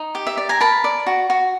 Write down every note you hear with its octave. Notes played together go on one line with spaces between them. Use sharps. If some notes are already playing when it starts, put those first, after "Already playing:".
Already playing: D#4
G4
E5
D5
G#5 A#5
A#4 A5 B5
D5
F#4
F#4